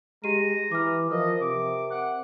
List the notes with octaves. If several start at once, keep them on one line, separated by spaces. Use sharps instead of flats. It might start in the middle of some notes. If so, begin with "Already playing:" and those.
G#3 G4 A#5 D#7
E3 D6 F6
F3 A#4 D#5
C3 D6
F#5